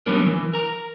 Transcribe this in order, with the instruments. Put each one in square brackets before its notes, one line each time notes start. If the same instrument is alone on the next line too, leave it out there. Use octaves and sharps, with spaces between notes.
[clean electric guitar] F#3 G3 B3 C#4 D4 A#4
E3
A#4 A#5